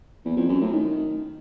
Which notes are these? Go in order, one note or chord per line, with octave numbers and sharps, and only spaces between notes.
E2
F2
F#2
A2
D#3